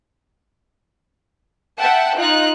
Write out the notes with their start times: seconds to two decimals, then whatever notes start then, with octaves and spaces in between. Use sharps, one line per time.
1.78 E5 F#5 G5 A5
2.17 D#4 F4 F#6